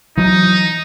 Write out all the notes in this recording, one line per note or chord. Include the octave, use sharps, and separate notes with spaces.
E3 F#3 D#4